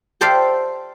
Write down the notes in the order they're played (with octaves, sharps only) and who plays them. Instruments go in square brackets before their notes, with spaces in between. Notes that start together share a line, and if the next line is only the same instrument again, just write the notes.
[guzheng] G4 A4 C5 D5 E5 F5